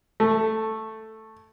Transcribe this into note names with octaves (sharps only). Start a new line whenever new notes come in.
A3